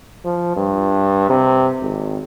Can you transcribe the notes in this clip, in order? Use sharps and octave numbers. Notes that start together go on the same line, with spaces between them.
F3
G2
C3
G#1